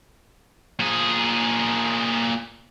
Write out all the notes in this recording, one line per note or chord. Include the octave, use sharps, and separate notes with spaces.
A#2 G#4